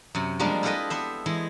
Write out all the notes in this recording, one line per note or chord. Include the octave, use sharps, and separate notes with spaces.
F#2 C3
F3 G3 G#3 A#3 D4
E4 F4 G4 A4 B4 D#5
B3 C5 E5
E3 G#3 E4